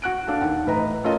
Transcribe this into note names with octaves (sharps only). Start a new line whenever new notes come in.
F#4 F#6 D7
D4 A4 F5 F#5
D#2 F#5
A2 E3 B4 D#5 A#5
A3 C#4 F4 A4 A#4 D#5